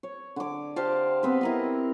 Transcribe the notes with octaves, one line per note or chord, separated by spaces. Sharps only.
C#5
D3 D6
G4 C5 F5 A5
B3 C4 B4
E4 A#4 D#5